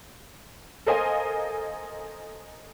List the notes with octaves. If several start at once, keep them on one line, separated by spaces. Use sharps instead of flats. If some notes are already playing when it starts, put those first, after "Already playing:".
A4 A#4 C5 D#5 F5 G#5